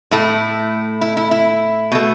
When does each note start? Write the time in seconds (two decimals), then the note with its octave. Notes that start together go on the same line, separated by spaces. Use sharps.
0.11 A2 A3 E4
1.01 E4
1.17 E4
1.31 E4
1.92 B2 A3